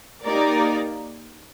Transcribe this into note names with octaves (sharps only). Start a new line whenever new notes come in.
A#3 D#4 G4 A#4 D5